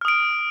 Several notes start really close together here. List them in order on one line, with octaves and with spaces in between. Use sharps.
F6 D#6 D7